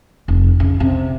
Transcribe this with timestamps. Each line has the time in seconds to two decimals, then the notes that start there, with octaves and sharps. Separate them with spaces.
0.28 F1
0.60 C#3
0.80 C3